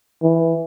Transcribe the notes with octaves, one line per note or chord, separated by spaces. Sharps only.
E3